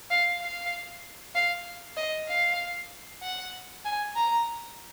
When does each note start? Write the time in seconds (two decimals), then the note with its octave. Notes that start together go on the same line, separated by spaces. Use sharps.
0.10 F5
0.40 F5
1.35 F5
1.97 D#5
2.28 F5
3.22 F#5
3.85 G#5
4.15 A#5